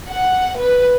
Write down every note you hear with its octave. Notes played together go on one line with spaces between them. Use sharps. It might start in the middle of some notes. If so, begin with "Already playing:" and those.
F#5
B4